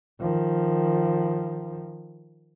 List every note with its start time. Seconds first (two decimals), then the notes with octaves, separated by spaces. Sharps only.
0.20 D#3 F3